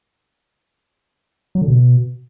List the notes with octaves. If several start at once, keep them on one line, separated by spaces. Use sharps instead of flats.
F#3
D3
B2